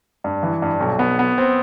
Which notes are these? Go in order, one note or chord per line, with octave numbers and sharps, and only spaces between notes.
G2
E3
G2
B1
B3
B3
C4